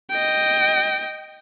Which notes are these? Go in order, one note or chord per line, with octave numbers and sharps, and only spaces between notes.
D#5 G5